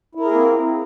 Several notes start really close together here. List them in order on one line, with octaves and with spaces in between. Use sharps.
E4 A#4 G#4 A#3 C4